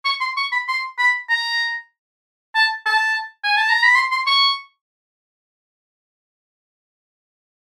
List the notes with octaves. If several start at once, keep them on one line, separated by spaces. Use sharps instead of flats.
C#6
C6
C#6
B5
C6
B5
A#5
A5
A5
G#5
A5
A#5
B5
C6
C6
C#6